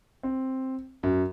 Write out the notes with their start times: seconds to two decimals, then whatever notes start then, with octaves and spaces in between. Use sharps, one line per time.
0.23 C4
1.03 F#2